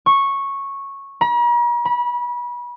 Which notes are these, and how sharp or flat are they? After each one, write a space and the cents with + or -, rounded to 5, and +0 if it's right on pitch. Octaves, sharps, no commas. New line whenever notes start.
C#6 -10
A#5 +45
B5 -30